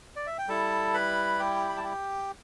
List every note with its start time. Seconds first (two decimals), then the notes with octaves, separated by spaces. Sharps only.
0.16 D5
0.26 E5
0.38 G5
0.48 G3 E4 A4 A5
0.94 B4 B5
1.39 G4 G5
1.69 B5
1.77 A5
1.84 G4 G5